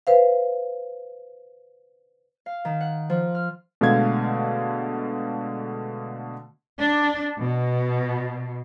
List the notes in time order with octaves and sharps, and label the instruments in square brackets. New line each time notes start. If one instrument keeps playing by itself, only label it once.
[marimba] B4 C5 F5
[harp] F5
D#3
F#5
F3
F6
[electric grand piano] B2 D3 G#3 A3 F5 G#6
[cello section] D4
B2